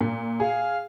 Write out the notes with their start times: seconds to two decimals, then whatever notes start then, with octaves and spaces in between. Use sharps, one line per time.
0.01 A#2
0.40 G#4 F5